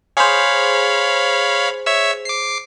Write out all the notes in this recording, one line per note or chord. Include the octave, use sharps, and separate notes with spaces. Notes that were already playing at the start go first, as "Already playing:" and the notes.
G#4 C5 C#5 F5 B5
C#5 E5 E6
D6 C7